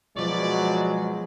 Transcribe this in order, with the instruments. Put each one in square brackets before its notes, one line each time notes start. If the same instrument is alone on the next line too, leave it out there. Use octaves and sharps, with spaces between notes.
[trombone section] B2 F#3 [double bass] F3 [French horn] G#3 [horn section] B4 C#5 D5